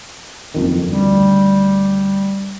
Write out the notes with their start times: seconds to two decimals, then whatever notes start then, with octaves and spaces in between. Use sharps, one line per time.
0.54 F#1 F2 D#3
0.89 D2 G3